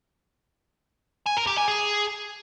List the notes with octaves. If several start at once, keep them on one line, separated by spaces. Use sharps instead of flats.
G#5
A#4
G4
G#5
G#4